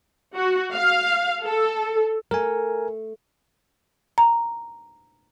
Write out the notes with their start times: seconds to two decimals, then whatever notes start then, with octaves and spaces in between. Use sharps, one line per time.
0.35 F#4
0.74 F5
1.44 A4
2.31 A3 A#4 G#5
4.18 A#5